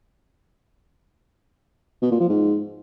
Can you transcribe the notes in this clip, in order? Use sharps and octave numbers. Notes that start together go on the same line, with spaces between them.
B2
A#2
F3
G#2